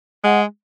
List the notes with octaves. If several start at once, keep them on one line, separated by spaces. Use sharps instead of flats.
G#3 F#5